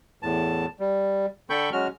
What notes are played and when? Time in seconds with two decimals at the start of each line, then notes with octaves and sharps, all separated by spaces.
0.23 E2 A2 A5
0.80 G3
1.50 D3 A4 G5 B5 C#6 G6
1.72 F#3 G#3 C#4 F#4 F6